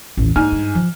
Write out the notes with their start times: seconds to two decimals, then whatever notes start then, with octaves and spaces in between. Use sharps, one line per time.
0.17 A1 D#2
0.36 G#2 E4 G#5 F6
0.52 G2
0.75 F3